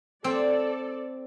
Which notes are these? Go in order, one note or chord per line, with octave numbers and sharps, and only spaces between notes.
C4 A4 D5